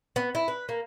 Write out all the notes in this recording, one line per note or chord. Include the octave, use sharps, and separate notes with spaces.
B3
E4
B4
A#3